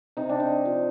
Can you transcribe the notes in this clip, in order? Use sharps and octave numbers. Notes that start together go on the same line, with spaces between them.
C3 D#4
D4
D#4
F3